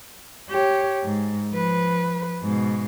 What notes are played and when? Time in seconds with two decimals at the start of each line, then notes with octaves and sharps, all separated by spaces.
0.50 G4 C#5
1.03 G#2
1.51 F3 B4
2.41 G#2 B2